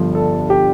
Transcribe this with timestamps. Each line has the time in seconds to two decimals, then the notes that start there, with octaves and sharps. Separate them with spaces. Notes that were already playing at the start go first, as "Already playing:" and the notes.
Already playing: G1 G2 F3
0.15 A4
0.50 G4